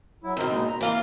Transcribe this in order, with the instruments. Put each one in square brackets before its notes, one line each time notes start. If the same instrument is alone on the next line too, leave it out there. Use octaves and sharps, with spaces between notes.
[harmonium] F#3 E4
[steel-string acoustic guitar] G#2 B2 [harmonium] D#3 C4 A#4
[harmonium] A#2 G#3 D#4
A#5
[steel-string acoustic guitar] E3 F4 F5 [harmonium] A#3